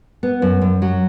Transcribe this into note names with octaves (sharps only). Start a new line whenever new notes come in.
B3
F#2
F#2
F#3